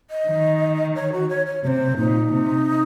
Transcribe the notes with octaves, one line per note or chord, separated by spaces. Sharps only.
D#5
D#3
C#5
F#4
C#5
C#5
C3 C5 C#5
A#2 D#4
C3